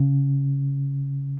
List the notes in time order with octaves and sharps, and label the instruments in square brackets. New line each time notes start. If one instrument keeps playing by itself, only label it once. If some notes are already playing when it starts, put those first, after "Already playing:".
Already playing: [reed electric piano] C#3